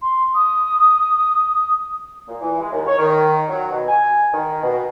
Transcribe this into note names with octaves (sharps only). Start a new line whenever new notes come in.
C6
D#6
A#2
E3
G#3
D#2
C#5
D#3
F#3
B2
G#5
D#3
B2